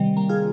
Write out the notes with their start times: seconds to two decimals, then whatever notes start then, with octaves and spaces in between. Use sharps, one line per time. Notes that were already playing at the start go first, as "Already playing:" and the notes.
Already playing: C3 D#3 G3
0.17 G3 A#3
0.29 F4 G#4